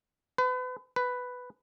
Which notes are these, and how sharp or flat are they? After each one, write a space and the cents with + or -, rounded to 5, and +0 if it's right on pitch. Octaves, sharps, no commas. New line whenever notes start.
B4 +35
B4 +5